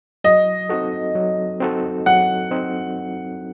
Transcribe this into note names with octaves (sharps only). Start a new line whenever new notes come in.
F#3 D#5
C4 D#4 F#4 A4
F#3
C4 D#4 F#4 A4
F#3 F#5
C4 D#4